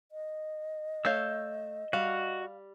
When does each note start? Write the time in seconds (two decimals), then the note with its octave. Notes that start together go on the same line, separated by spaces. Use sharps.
0.12 D#5
1.05 A3 C#5 F5 E6 G6
1.93 G3 F#4 F5